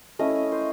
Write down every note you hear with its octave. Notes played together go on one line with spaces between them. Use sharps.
A3 C#4 E4 D#5
C5